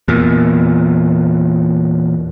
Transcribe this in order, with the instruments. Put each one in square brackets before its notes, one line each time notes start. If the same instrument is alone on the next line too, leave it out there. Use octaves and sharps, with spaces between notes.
[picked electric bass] E2 A#2